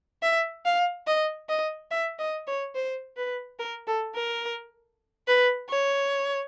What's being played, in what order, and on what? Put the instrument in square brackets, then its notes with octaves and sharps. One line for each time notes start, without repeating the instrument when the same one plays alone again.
[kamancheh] E5
F5
D#5
D#5
E5
D#5
C#5
C5
B4
A#4
A4
A#4
B4
C#5